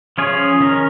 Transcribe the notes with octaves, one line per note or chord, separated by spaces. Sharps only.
F3 C#4 F4 G#4 C#5
D#3 C#4 A#4